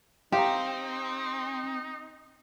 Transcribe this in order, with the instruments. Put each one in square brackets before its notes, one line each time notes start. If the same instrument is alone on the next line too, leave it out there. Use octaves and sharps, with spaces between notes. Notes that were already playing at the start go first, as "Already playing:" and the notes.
[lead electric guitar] C4 [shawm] D#4 [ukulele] G4 [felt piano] F5 A#5